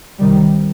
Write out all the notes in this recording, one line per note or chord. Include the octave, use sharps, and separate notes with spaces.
C2 C3 D#3 G3